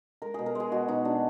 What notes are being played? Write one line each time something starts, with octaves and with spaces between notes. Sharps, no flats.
G#3 A#4
B2 G#4
A#4
G#3 G#4
B2 F#4
B2 D#4
B2 D4